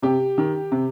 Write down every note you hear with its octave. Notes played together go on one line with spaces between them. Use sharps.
C3 G4
D#3
C3